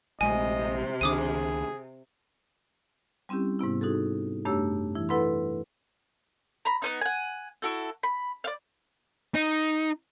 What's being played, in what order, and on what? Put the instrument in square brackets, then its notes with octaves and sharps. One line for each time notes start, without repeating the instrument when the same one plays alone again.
[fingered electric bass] A#1 G#3 A3 [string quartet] C3 [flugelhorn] D#5 [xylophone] G#5
[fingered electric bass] C#2 D#3 D4 [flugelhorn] G#4 [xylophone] D6 D#6 D#7
[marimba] G3 C4 C#4 E4 G4
G#2 C3 B3 E4
D#4 F#4 G#4 A4
F#2 A3 D4 G4 C#5 E6
E3 E4
E4 A4 B4 F#5 B5 C6
[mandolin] A#5 B5
B3 C#4 D#4
F#5 G#5
E4 F#4 A4
B5
D5 F5
[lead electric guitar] D#4